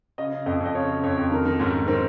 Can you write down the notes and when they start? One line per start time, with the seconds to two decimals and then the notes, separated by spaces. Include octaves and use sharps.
0.18 C#3 D#5
0.32 C#3
0.46 F2 D#5
0.60 F2
0.65 D#5
0.75 C#3 C#5
0.89 C#3
1.03 F2 C#5
1.17 F2
1.31 D#3 A#4
1.45 D#3
1.59 G#2 C#4
1.74 G#2
1.88 D#3 C4